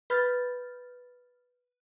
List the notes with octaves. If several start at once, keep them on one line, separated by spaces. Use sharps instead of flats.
B4 B5 F6 G6 A6